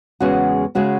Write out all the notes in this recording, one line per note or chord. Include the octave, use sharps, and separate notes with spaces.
E2 C#3 G#3 C#4 F#4
C#3 G#3 C#4 F#4